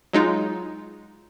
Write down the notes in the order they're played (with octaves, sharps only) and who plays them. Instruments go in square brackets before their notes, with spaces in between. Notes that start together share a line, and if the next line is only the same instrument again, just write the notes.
[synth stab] F#3 G#3 D#4 F4